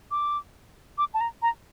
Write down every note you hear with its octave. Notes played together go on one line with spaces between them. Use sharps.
D6
D6
A5
A#5
A#5